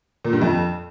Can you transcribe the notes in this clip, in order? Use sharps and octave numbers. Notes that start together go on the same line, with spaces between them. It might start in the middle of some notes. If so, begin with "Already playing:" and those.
A#2
G2
F2